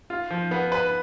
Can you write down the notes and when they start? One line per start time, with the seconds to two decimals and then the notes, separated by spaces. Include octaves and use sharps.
0.10 F4
0.30 F3
0.51 B3
0.72 B4